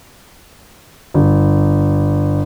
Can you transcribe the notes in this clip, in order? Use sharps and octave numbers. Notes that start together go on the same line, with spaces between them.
G1